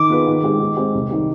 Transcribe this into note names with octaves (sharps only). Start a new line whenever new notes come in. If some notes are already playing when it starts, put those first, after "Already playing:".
Already playing: D#3 D6
B3 F4 G#4 B4
D#3
G#3 C4 G4
D#3
G#3 C4 G4
C2
C3 D#3 G3